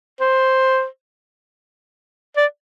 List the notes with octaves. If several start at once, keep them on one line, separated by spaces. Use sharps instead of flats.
C5
D5